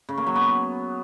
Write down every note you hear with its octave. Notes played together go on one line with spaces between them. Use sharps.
C#3
A#3
F#3
B3